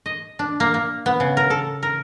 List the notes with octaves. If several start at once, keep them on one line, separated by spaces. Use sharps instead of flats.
D#5
D4
A#3
A#3
B3
C#3
A#4
A4
A#4